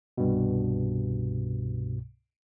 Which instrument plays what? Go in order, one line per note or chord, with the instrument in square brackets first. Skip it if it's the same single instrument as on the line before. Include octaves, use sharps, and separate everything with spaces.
[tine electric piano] C2 G2 B2